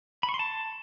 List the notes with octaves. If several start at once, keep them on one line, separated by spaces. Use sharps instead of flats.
B5
C#6
C6
A5